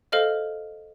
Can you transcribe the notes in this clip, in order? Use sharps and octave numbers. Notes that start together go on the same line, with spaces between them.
A4 C5 D#5 F5 F6